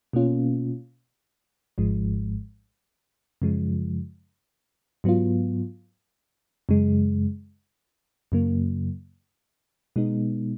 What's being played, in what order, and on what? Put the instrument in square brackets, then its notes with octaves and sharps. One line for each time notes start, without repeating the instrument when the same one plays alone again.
[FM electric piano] B2 A#3 C#4 F4
G#1 G#2 F3 G#3
F#2 C#3 F3 G#3
G#2 F#3 B3 F4
F#2 C#3 G#3
F#2 C#3 F#3 A#3
B2 G#3 B3 D#4